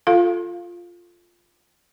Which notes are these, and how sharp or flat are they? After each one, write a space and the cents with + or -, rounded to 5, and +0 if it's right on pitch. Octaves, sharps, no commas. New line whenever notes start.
F4 +0 A4 +0 F5 +0